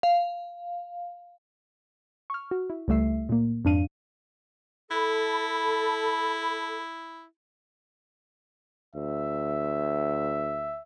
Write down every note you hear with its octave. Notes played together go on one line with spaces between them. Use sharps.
F5
C#6 F6
F#4
E4
C#2 G3 A3 E5 C7
A#2 A#3
F2 G#2 D4 F5 D#7
E4 A4 B5
D2 E5